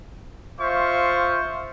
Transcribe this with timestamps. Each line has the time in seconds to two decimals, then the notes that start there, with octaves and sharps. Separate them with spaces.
0.59 F4 C5 E5 F5 C#6